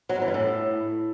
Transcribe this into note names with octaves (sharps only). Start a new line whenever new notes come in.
F#3
G#2
E3
G2
A2